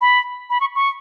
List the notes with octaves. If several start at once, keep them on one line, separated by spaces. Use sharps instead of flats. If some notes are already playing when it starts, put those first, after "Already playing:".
B5
B5
C#6
C#6